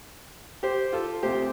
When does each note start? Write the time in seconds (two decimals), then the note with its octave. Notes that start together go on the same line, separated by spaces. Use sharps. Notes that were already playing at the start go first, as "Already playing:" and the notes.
0.63 G4 C5
0.93 F4 A4
1.23 D2 C3 G4 C5